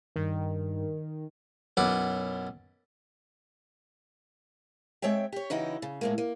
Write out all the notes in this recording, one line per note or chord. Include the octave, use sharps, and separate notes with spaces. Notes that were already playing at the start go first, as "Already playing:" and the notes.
G2 D#3
B1 F#2 E4 F#5 D6
G#3 C4 C#5 E5 G5
G4 C#5
C#3 E3 D#4 E4 F#4 G4
C#3
A2 G#3 A#3
A#3